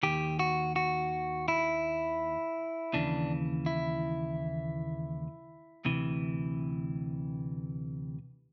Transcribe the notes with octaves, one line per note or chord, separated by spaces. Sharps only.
D#2 D#3 G4
F#4
F#4
E4
D#2 C#3 E3 D4
E4
D2 C3 E3